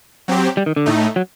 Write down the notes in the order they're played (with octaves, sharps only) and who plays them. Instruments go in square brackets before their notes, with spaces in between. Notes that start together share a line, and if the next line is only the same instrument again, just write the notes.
[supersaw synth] F#3 C4 G4
[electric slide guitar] G3
D#3
D3
[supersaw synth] A2 A3 D#4
[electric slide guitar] F#3